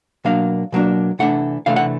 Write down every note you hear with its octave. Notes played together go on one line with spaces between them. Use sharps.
B2 F#3 A#3 D4 F5
B2 F#3 A#3 D4
C3 E3 A3 D4 F#5
C3 E3 A3 D4 F5
F#5